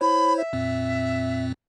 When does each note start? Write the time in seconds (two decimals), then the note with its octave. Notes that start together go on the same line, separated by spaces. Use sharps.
0.01 E4 C5 C#5 B5
0.38 E5
0.53 F2 A#2 C4